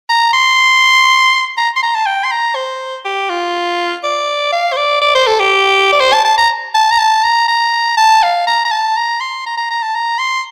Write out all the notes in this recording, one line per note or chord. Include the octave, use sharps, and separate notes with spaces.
A#5
C6
A#5
C6
A#5
A5
G5
C6
A#5
C5
G4
F4
D5
F5
C5
D5
D5
C5
A4
G4
D5
C5
A5
A5
A#5
A5
A#5
A5
A#5
A#5
A5
F5
A#5
A#5
A5
A#5
C6
A#5
A#5
A#5
A5
A#5
C6